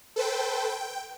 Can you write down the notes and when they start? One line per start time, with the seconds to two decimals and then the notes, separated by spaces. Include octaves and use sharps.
0.16 A4 B4 C5 G5
0.69 G5